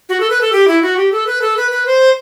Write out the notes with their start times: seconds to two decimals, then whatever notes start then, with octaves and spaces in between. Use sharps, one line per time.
0.09 F#4
0.20 A4
0.30 B4
0.41 A4
0.53 G4
0.68 E4
0.83 F#4
0.97 G4
1.12 A4
1.27 B4
1.42 A4
1.57 B4
1.71 B4
1.86 C5